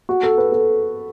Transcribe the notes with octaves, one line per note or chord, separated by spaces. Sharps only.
F#4
A4
B4
A4